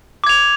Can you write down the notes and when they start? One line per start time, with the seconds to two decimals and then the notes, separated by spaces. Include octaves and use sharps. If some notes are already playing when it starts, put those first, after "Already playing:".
0.24 D6
0.26 G#6
0.29 F7